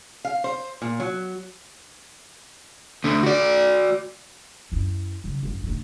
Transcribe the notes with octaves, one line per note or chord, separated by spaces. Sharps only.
F5
C5
A#2
F#3
D2 D3
F#4 D5
F#2 E4
C#3 F#3
G#1 F#2
A2 D3